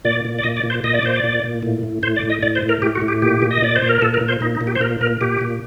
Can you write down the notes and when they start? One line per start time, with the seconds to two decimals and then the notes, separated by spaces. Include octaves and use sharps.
0.05 A#2 D5
0.25 A#2
0.39 D5
0.44 A#2 D#5
0.57 D5
0.64 A#2
0.70 C5
0.84 A#2 D#5
0.94 D5
1.03 A#2 C5
1.16 D5
1.24 A#2
1.44 A#2
1.63 A2
1.83 A2
2.03 A2 C5
2.16 D5
2.23 A2
2.30 D#5
2.43 A2 D5
2.55 C5
2.62 A2
2.69 A#4
2.82 A2 G4
2.95 F#4
3.02 A2
3.08 G4
3.22 A#2 G4
3.42 A#2
3.51 D#5
3.62 A#2 D5
3.76 C5
3.82 A#2
3.89 A#4
4.02 A#2 A4
4.14 A#4
4.21 A#2
4.28 C5
4.41 A#2 D#4
4.55 D#4
4.61 A#2
4.67 G4
4.75 C5
4.80 A#2 A#4
5.01 A#2 A#4
5.21 A#2 G4
5.41 A#2